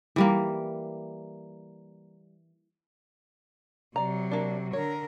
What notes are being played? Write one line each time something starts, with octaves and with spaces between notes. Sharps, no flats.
E3 G3 A#3
C3 F#3 D5 A#5
A#3 D4
D3 A#4 C#5